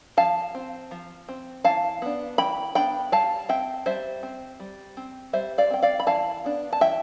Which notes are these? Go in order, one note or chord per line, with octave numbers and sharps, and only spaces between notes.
F3 F5 A5
C4
F3
C4
E3 F5 A5
B3 D4
E3 G5 B5
B3 D4 G5 B5
G3 F5 A5
C4 E5 G5
G3 C5 E5
C4
G3
C4
G3 C5 E5
D5 F5
C4 G5
D5 F5
B5
E3 F5 A5
B3 D4
A5
E3 E5 G5